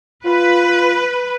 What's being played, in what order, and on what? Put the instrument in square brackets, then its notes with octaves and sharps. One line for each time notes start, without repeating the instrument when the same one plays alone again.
[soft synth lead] F4 [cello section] B4